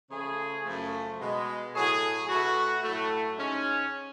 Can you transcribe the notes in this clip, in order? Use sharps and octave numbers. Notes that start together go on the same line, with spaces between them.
C#3 F3 A3 G#4
F#2 C#3 F3 A3
B2 G#3
A2 F#3 A3 G#4
B2 A3 F#4
A2 F#3 A3
G#2 G#3 C#4